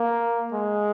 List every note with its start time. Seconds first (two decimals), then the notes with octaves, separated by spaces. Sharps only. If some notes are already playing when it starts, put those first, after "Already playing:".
Already playing: A#3
0.53 G#3